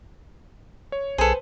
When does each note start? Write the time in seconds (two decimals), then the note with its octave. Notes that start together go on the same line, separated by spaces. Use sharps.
0.92 C#5
1.18 B1 G#4 A4 B4 C5